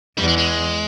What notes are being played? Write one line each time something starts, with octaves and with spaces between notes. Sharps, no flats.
E2 G3
G#3
G#3